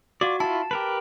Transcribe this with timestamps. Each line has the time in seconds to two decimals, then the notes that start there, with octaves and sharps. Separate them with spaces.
0.21 F4 F#4 D5
0.40 E4 F4 A5
0.71 G4 A#4 B4